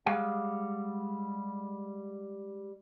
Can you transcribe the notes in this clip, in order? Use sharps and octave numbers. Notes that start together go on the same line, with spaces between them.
G3 G#3 G#4 F5 F#5